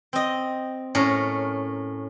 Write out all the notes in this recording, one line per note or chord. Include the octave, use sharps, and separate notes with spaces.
C4 D#5
A2 C#4 A#4